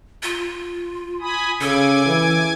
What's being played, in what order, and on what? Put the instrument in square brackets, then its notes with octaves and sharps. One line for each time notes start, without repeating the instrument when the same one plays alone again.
[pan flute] F4
[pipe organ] G#5 B5 D#6
[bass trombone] C#3 [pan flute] A4 [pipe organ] G#5 D6 G#6
[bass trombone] E3